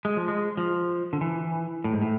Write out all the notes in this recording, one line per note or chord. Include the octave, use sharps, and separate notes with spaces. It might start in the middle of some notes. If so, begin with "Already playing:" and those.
G#3
F3
G#3
F3
D3
E3
A2
G#2
A2